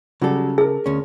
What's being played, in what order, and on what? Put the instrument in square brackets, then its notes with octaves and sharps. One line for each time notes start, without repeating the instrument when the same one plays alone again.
[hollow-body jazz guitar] C#3 A4 [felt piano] F#3 G3 G4
[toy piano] G#4 [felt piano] A#4 A5
[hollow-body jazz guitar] D2 C#4